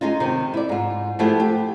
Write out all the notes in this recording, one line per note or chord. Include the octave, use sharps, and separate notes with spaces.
G#3 C#4 D#4 F4
C3 D#3
E4 D5
G#2 F4
F3 A3 B3 E4 G4 G#4
G4